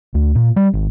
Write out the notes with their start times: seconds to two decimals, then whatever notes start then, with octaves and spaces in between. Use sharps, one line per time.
0.14 D2
0.35 A#2
0.56 G3
0.74 G#1